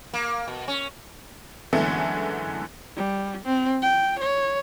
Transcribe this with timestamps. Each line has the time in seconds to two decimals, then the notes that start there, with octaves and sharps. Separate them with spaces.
0.14 A#3
0.48 B2
0.68 C#4
1.73 F#2 D3 E3 G#3 A3 B3
2.96 G3
3.45 C4
3.82 G5
4.19 C#5